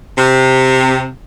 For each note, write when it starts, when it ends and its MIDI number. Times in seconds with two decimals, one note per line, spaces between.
0.17 1.07 48